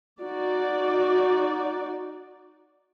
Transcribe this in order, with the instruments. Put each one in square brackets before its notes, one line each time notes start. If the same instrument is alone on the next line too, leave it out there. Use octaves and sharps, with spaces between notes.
[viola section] D#4 F#4 D5